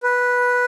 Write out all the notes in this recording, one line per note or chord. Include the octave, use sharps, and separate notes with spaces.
B4